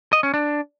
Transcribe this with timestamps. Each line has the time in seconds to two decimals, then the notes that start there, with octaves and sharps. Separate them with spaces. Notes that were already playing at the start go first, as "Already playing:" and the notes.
0.13 D#5
0.23 C#4
0.34 D4